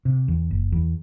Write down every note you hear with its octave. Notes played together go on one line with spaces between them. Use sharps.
C3
E2
F#1
E2